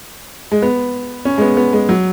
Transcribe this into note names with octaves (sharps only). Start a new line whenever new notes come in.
G#3
B3
C#4
G#3
B3
B3
G#3
F#3